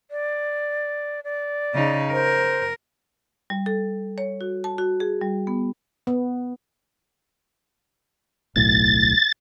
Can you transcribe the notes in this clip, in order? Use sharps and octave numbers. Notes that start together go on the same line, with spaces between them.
D5
D5
C#3 D#4
A#4 C5
G3
A4
C#5
F#4
A5
F#4
G#4
G3
B3
B3
D1 B1 A2 A6